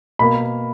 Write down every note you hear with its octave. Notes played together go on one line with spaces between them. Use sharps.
B2 A#3 B5